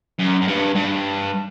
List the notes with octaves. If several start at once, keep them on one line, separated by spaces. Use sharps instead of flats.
F#2
F#2
G2
G2